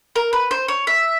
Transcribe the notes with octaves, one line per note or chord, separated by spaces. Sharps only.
A#4
B4
C5
C#5
E5